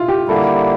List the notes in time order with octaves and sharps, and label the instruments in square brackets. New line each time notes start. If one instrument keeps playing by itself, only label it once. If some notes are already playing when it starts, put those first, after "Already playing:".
Already playing: [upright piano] E4 F4
G4
[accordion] D3 G3 A#3 E4 [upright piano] A4